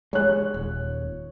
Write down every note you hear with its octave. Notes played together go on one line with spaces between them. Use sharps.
G#3 C#5 F#6
D#1